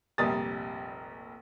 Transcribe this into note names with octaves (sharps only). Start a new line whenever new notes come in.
F1 A#1 G3 A#4 D#6 A6